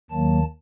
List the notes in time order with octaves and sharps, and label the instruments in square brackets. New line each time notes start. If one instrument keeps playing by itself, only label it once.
[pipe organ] D#2 D#3 F#3 A#3 A5